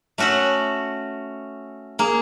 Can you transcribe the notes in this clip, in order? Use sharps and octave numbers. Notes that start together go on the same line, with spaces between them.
A3 C#4 F#4 E5 F#5
A#3 G#4